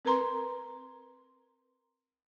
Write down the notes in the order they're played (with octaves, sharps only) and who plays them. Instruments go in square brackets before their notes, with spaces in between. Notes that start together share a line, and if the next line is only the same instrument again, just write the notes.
[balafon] C4 A#4 B4 A#5 C6